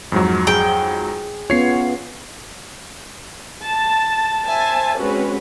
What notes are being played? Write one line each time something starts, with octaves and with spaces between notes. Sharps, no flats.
F2 G#2 F#3
G#4 G5
B3 C#4 F4 C#5 C7
A5
C5 E5 G#5 A5
G#3 C4 C#4 F#4 B4